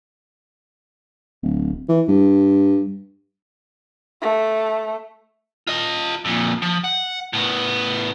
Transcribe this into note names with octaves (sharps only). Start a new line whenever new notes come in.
D1
E3
G2
A3
F4 D#5
F2 A#2
F3
F#5
A2 B3